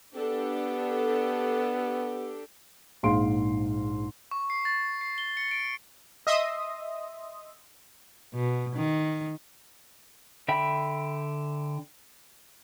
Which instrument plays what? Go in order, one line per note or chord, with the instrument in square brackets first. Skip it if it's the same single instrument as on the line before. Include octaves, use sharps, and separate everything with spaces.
[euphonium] B3 [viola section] D4 G4 A4
[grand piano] A#1 G#2 G#4 F5 C6 D7
[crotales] C#6
C7
A6
C7
G7
C#7
D7
[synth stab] D#5 E5 C6 D#6
[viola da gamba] B2
D#3
[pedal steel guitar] D3 E5 G5 B5